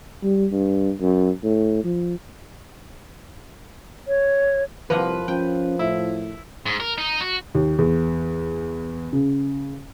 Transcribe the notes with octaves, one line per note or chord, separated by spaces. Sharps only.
G3
G2
F#2
A2
F3
C#5
C2 F3 A#3 B4 F#5
F3 C#4 G5
A2 E4
G#2
A#4
D#4
F#4
D#2
E2
C#3